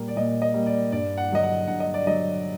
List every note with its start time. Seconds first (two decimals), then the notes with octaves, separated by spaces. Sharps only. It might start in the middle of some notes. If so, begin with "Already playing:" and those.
Already playing: A#2 G3 A#3
0.08 D5
0.16 A#2 D#5
0.42 D#5
0.54 G3 A#3
0.66 D5
0.92 G2 D5
1.18 F#5
1.30 D3 F#3 D#5
1.43 F#5
1.68 G2 F#5
1.80 D#5
1.94 D5
2.06 D3 F#3 D#5